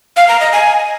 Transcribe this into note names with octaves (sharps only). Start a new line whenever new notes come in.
F5
A#5
D#5
G#5